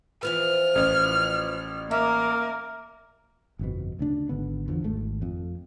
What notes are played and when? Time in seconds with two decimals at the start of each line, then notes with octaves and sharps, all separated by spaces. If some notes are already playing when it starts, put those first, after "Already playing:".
0.23 E3 F3 B3 F6
0.75 A1
1.91 A#3 A#4 E5
3.59 G1 F2 B2
3.99 D2 C#3 D4
4.29 G#1 D3 B3
4.68 E2 D3 F3
4.84 G#1 A3
5.22 F2